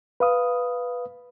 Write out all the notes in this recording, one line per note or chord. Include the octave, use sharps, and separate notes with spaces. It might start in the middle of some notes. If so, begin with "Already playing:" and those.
B4 F5 D#6